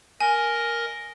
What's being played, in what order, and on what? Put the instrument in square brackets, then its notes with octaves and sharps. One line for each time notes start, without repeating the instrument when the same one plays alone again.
[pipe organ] A#4 D#5 [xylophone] G#5